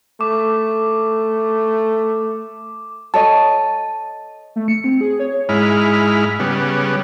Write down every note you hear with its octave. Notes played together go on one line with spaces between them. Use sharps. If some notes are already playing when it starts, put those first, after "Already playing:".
A3 D6
A4 C#5 D#5 A5
A3
C#7
C4
G#4
C#5
G#2 G#3 E4 B5 F6
C#3 G3 B3